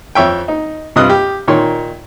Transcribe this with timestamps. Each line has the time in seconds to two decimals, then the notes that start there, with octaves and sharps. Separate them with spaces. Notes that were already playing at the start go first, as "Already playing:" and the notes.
0.15 F2 C#5 E5 G5
0.48 D#4
0.96 G2 C3 F4 D#5 D#6 F#6
1.10 G4
1.48 A#2 D#3 C#5 C6